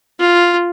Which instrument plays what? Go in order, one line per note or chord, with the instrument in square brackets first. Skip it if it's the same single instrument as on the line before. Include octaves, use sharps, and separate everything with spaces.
[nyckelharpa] F4